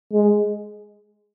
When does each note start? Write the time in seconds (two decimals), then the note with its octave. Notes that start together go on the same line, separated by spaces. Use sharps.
0.13 G#3